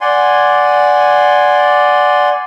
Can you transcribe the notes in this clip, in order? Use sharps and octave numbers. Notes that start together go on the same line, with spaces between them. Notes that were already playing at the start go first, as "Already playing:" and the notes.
D5 F#5 G#5 C6